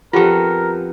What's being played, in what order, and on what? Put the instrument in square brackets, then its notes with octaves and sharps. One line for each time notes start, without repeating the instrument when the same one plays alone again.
[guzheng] F2 B3 [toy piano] F4 G4 G5 [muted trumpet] A#4